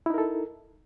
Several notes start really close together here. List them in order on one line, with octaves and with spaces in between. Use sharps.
E4 D#4 A#4 A4